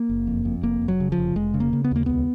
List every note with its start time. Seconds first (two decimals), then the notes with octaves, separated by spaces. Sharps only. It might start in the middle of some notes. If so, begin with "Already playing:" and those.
Already playing: A#3
0.09 F#1
0.27 F2
0.45 F2
0.63 F1 A#3
0.82 F1
0.88 F#3
1.00 C#3
1.12 F3
1.18 F1
1.36 F1 G#3
1.54 C#3
1.60 A#3
1.73 C#3
1.84 B3
1.91 D#2 A#3
2.06 C#2 B3